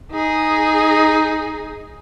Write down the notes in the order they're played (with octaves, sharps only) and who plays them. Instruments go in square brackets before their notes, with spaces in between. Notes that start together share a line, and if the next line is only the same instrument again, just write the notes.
[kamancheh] D#4 G#4